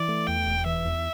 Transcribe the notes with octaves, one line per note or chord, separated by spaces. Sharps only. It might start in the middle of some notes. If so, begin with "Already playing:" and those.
Already playing: E3 D5
A3
E2 G5
E1
E3 E5
E2